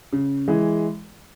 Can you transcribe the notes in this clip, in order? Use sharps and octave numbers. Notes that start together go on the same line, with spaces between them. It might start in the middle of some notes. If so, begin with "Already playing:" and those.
C#3
E3 G#3